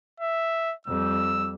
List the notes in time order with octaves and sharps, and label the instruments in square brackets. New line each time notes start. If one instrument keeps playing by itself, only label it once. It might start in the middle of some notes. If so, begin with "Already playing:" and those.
[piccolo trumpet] E5
[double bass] F2 G3 [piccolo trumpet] E6